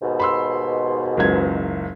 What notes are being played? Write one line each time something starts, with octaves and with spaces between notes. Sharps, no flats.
D#2 G#2 B2
B5 C6 E6
F#1 C#2 G#6